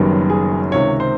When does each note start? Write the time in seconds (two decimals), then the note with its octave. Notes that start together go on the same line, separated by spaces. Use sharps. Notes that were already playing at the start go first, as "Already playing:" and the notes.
Already playing: F#1 F#2 D#3 G3 B3
0.30 G#4
0.71 C#2 C3 D#3 C#5
1.00 C5